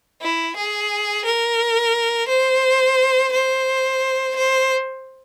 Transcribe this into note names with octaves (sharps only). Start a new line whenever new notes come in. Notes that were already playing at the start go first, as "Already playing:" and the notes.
E4
G#4
A#4
C5
C5
C5